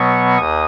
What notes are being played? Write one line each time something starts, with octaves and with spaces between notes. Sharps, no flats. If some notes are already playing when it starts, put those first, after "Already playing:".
Already playing: B2 F#3 B3 C#6
D#2 D#6